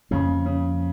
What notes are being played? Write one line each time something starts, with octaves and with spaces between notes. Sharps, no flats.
F2 C#3 F3 A#3
C#3